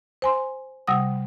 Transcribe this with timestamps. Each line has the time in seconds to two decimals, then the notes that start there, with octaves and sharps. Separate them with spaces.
0.22 C5 G#5 C6
0.88 C3 G3 F#5 D#6